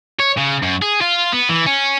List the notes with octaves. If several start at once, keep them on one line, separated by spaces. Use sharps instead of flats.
C#5
C#3
F#2
G#4
F4
B3
E3
C#4